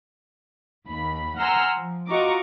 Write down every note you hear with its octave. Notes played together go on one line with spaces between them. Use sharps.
D#2 B5
F#5 G#5 A#5 C6 E6 F6
F3
F4 F#4 D#5 A#5 C#6 D6